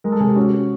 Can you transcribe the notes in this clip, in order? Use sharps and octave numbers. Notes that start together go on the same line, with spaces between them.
G#3 A#4
A4
C3 G#4
G4
C#4 F#4